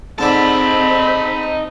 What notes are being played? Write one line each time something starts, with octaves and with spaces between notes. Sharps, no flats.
G#2 D3 C4 D#4 A5 B5 D6